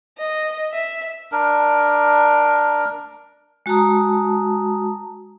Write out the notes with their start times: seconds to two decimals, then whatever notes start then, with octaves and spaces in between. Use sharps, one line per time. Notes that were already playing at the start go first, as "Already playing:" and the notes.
0.18 D#5
0.73 E5
1.32 D4 A#4
3.66 G#3 F#4 A5 A#5 D#6